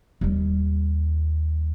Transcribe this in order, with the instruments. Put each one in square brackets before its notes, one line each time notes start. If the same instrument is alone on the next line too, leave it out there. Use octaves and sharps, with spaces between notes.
[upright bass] D#2 G3